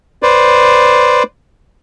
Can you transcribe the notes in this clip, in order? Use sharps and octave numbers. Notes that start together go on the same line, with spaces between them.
B4 C5 D5